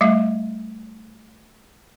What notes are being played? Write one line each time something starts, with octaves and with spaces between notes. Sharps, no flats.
G3 A3 F5